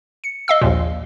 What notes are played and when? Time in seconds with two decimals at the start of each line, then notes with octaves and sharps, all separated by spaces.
0.24 C#7
0.48 D#5 F5 E6
0.62 A#1 D#2 A#2